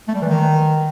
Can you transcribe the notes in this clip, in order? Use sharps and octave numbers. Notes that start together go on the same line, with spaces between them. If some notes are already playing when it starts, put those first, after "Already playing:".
A3
G3
E3
D#3